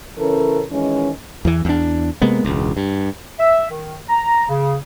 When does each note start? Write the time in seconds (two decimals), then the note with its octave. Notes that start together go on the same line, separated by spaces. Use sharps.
0.18 C#3 E3 C#4 A4 A#4
0.70 D#3 E3 G#3 C#4
1.45 E2 E3
1.65 E2 D4
2.21 C3 G#3 A#3 B3
2.45 E1 C#2
2.77 G2
3.40 E5
3.70 D#3
4.09 A#5
4.49 C#3